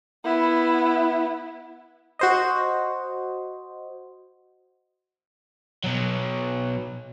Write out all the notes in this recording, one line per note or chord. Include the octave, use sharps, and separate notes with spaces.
B3 E4
F#4 C5 D#5
B2 F#3